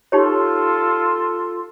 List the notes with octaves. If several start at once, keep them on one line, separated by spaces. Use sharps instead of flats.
D#4 F4 G4 A4 C#5 C6